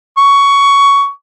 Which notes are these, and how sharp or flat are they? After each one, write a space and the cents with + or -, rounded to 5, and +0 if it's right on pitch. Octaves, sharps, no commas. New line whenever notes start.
C#6 +15